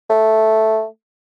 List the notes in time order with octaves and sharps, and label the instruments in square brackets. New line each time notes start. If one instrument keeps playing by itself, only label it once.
[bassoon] A3